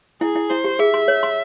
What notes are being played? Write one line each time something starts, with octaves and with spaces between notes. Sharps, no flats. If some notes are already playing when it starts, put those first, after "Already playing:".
E4 G#4
E4
E4 C5
G4
G#4 E5
C6
C#5
C6